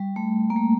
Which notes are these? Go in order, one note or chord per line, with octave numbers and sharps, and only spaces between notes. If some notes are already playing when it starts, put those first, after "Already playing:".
Already playing: G3
A3
A#3
A3